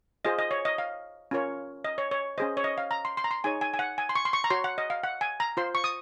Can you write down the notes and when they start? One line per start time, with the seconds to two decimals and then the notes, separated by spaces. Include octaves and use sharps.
0.25 F4 G#4 C5 D#5
0.39 D#5
0.51 C#5
0.65 D#5
0.78 F5
1.31 C#4 F4 A#4 C#5
1.84 D#5
1.98 C#5
2.11 C#5
2.38 C#4 G#4 C5 D#5
2.57 C#5
2.64 D#5
2.78 F5
2.91 A#5
3.05 C6
3.17 C6
3.24 A#5
3.31 C6
3.44 D#4 G#4 C#5 G#5
3.61 G#5
3.74 G#5
3.79 F#5
3.98 G#5
4.09 C6
4.15 C#6
4.25 C6
4.33 C#6
4.44 A#5
4.50 F#4 C#5 C6
4.64 F#5
4.78 D#5
4.90 F5
5.04 F#5
5.21 G#5
5.40 A#5
5.57 F4 C5 C6
5.75 C#6
5.84 D#6